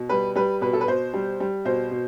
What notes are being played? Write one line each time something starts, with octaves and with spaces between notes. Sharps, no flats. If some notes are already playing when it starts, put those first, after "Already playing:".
Already playing: B2
G3 B4
G3 B4
B2 B4
A4
B4
B2 C5
G3
G3
B2 C5
B2